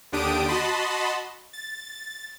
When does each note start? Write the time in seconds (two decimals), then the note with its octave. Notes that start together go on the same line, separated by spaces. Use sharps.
0.12 D#2 D3 D4 G4 D#6 D7
0.47 F#4 D#5 A5 B5 C6
1.53 A6